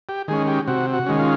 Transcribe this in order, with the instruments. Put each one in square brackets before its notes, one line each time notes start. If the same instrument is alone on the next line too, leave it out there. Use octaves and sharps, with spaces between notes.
[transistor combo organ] G4
D#3 G#3 C#4 G#4
G4
C3 F#4
F#4
D#3 G#3 C#4
F4